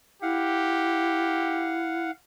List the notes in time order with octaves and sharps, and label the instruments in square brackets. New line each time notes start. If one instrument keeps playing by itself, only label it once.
[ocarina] E4 [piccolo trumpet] G4 [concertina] F5 F#5